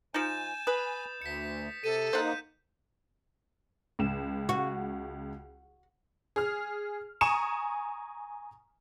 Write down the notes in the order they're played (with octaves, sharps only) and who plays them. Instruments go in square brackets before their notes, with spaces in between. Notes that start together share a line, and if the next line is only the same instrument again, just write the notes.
[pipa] F3 D#4 [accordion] G#5 [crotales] G6 A6 E7
[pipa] B4 [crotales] D#6
[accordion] D2 [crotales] B6 C#7
[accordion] C3 [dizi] A4 [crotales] D#7
[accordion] A#3 D#4 [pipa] C5 F#5 [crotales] G6
[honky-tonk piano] C#2 E7
[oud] F#4
[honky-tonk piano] G#4 F6
G#5 A#5 C#6 D#6 D#7 E7